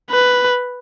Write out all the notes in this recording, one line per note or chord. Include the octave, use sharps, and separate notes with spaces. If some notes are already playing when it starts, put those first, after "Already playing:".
B4